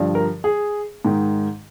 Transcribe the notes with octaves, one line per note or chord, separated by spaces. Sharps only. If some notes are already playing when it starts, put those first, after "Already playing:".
Already playing: G2 D3 F3
A#4
G#4
G#2 D#3